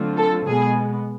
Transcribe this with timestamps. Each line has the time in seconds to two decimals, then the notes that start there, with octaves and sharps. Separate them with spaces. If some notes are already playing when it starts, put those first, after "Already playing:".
Already playing: D3 F#3 A3 C4 F4
0.17 A4
0.46 B2 G#3 B3 G#4